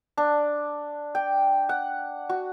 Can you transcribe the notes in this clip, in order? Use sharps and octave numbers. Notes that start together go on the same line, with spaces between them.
D4
G5
F#5
F#4